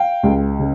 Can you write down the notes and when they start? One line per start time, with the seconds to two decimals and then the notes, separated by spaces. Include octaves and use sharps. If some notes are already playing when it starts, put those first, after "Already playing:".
Already playing: F5 G5
0.23 C#2
0.59 C#3